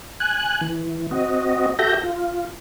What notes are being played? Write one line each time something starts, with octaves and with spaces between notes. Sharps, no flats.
G#5 F#6
E3
C4 F#4 D#5
F#4 G4 A4 E5 G6 A#6
F4